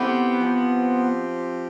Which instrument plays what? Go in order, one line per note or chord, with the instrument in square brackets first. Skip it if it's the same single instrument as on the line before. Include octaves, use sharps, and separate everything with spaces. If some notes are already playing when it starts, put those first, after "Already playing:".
Already playing: [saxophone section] E3 A3 C4 G4 [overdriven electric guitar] B3
[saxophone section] F3 C4 G4